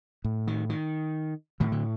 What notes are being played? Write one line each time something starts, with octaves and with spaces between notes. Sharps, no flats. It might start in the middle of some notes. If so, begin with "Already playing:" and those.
A2
D#3
D#3
A2 D#3
D3